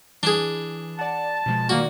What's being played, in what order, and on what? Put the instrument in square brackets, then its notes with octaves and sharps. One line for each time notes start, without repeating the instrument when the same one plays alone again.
[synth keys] E3 [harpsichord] D4 G#4
[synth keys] D5 F#5 [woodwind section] A5
[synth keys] B2 F3 G#3
[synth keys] D#3 D5 [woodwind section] A#3 [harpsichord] F#4